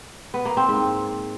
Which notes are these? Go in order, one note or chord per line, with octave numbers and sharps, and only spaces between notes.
B3
A#3
C4
G#2